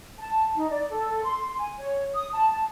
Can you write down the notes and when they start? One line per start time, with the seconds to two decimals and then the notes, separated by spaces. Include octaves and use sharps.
0.19 A5
0.56 D#4
0.70 D5
0.91 A4
1.24 C6
1.58 G#5
1.79 C#5
2.14 D#6
2.34 A5
2.50 A5